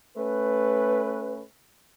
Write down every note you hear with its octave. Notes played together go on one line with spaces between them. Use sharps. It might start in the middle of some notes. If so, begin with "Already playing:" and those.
A3 C#4 B4